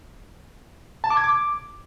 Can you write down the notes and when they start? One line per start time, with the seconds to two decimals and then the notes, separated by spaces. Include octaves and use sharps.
1.04 A5
1.10 D6
1.17 G#6
1.24 D6